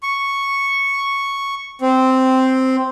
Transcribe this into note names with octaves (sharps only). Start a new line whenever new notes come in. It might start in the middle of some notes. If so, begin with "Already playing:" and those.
C#6
C4